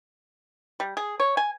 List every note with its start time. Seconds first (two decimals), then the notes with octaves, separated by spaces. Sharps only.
0.80 G3
0.97 G#4
1.20 C#5
1.37 G#5